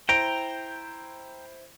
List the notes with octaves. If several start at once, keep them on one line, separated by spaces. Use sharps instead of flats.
E4 C5 G5 A#5 D7